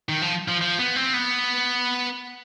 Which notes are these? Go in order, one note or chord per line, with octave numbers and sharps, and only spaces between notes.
D#3
F3
F3
F3
B3
C4
B3